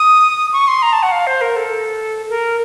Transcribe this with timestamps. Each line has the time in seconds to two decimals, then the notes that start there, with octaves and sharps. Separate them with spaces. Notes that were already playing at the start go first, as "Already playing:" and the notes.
Already playing: D#6
0.53 C#6
0.68 C6
0.82 A#5
0.93 A5
1.03 F#5
1.12 F5
1.27 C5
1.41 A#4
1.56 A4
2.30 A#4